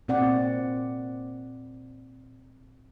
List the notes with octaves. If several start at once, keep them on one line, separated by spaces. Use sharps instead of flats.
A#2 C4 D5 F#5